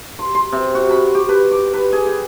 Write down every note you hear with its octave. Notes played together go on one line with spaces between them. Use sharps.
C6
C6
C3
F#4
B5
G4
B4
D6
B4
G#4
G5